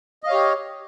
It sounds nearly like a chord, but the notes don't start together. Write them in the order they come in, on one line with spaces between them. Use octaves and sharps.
D#5 F5 C#5 G4